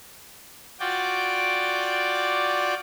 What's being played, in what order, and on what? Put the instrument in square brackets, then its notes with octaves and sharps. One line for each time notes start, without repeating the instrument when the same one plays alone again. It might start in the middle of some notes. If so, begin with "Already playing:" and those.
[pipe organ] F4 F#4 D5 G5 D6